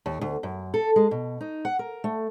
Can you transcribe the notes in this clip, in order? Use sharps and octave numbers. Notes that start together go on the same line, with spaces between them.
D#2
D2
F#2
A4
G#3
B2
D#4
F#5
A#4
A3